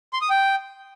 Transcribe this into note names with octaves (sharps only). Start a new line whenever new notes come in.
C6
D#6
G5